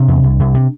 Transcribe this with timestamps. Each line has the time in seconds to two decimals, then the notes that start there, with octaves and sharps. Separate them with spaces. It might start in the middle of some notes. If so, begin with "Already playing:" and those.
Already playing: C3 D4
0.08 E2
0.23 C2
0.39 C2
0.54 C3